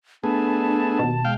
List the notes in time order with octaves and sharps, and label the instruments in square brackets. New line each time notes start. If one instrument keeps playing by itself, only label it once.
[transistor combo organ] A3 B3 G#4 [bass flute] D4 [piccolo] A5
[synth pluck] D#2 B2
[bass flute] G#3 [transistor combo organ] F5 G5